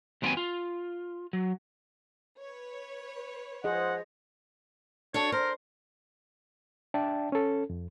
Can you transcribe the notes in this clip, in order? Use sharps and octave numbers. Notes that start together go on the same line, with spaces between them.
D#2 A#2 F#3 B3 C4 G#5
F4
F#3
B4 C#5
F3 G#4 C5 D#5 F#5
D4 F#4 A4 C#5
A#4 C5
D4 D5 E5 G5 A5
C#4 A4
F2